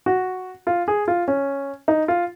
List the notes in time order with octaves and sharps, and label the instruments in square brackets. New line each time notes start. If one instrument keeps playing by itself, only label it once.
[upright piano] F#4
F4
G#4
F4
C#4
D#4
F4